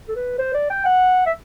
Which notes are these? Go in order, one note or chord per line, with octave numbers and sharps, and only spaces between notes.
A4
B4
C5
D5
G5
F#5
E5